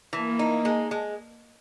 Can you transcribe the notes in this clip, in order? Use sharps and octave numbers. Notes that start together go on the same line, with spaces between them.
E3 A#3
D#4
G#3
G#3